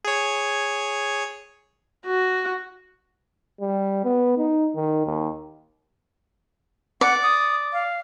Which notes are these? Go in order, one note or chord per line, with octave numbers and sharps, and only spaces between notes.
G#4 C#5
F#4
G3
B3
D#4
D#3
D#2
D5 F#5
D#6
F5